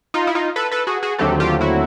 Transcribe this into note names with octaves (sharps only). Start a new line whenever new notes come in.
D#4 F4
E4
D#4 F4
A4 B4
A4 B4
F#4 G#4
F#4 G#4
D#2 D3 F#3 A3 C4 G4 A4
F4 G4
E4 F#4